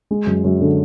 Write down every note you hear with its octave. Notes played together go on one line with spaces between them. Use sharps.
G#3
F#2
F#2
D3